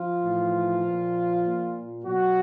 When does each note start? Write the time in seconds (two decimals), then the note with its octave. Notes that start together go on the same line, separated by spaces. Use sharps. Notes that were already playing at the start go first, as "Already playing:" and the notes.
Already playing: F3 F4
0.23 A2 E3
0.84 A#2
1.44 A#2
2.05 B2 F#3 F#4